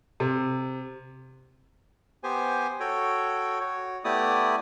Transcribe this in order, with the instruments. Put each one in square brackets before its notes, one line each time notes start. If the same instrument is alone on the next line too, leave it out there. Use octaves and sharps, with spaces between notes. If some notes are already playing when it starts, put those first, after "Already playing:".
[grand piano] C3
[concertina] B3 G4 C5 G#5
F#4 A4 C#5 G5
F#4 C#5
A3 B3 E4 G4 D5 D#6